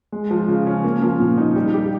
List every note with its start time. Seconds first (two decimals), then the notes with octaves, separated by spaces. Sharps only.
0.12 G#3
0.31 F3
0.48 C#3
0.67 C#4
0.84 A#3
1.02 F3
1.20 A#2
1.38 D#4
1.56 G3
1.74 G4